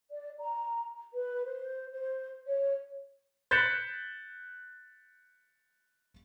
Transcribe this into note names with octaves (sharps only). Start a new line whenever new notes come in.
D5
A#5
B4
C5
C5
C#5
F#6 G6 A6 B6 C#7 E7